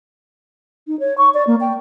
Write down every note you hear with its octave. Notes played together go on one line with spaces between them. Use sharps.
D#4
C#5
C#6
D5
A#3
G5